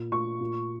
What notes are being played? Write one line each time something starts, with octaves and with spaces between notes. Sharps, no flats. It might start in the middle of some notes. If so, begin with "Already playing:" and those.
Already playing: A#2
A#2 C#6
A#2